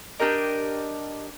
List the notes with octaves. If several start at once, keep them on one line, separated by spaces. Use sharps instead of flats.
D4 G4 A#4 D#5